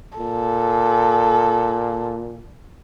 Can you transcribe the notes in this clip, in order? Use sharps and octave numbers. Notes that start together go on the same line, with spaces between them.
A#2 A4